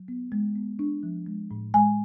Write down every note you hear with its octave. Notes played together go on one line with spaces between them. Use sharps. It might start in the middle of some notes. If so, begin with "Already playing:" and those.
Already playing: F#3
B3
G#3
B3
D4
F3
G#3
A2
G#3 G#5